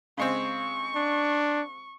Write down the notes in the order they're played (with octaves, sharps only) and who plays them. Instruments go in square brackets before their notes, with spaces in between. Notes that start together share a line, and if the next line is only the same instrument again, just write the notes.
[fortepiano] C#3 G#3 C4 [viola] C#6
[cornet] D4